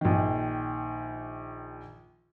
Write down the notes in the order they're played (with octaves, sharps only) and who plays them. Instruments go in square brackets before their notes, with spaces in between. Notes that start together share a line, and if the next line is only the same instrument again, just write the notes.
[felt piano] A#1 D#3